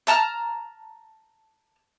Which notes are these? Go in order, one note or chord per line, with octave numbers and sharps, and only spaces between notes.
E5 A5 A#5 F6